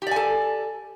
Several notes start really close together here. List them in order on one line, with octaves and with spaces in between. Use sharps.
G4 D5 G#5 A4